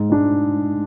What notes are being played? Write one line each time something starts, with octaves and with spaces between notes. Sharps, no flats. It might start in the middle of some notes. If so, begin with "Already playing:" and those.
Already playing: G#2
G#3 D4